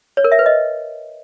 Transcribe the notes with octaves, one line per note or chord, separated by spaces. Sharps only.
C#5
A#4
E5
B4
D#5